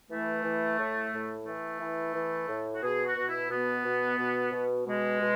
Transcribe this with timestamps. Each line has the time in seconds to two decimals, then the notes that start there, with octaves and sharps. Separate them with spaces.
0.10 E3 A3
0.44 E3
0.78 A2
1.12 A2
1.45 E3 A3
1.79 E3
2.14 E3
2.48 A2
2.73 F#4
2.82 B2 G#4
3.05 F#4
3.16 B2
3.27 E4
3.49 B2 B3
3.85 B2
4.18 B2
4.52 B2
4.86 B2 G#3
5.20 B2